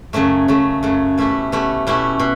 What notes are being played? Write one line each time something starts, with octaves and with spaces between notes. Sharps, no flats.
F#2 C#3 F#3 A3
F#2 C#3 F#3 A3
F#2 C#3 F#3 A3
B2 A3 C#4 E4 G4
B2 A3 C#4 E4 G4
B2 A3 C#4 E4 G4
B2